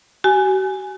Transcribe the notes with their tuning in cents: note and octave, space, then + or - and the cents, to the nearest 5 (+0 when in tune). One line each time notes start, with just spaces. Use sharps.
F#4 +45 G#5 +0